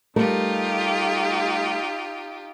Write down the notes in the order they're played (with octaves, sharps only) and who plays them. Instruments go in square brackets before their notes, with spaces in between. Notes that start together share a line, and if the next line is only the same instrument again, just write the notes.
[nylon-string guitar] G3 A3 A#4 [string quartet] D#4 F4 G4